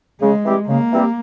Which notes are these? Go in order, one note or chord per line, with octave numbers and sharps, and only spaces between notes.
C#3 G#3
E3 G3 C4 G4
C#3 A#3
E3 G3 C4 G4